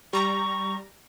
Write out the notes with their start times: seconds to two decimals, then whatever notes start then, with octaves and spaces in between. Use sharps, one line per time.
0.13 G3 A#5 C#6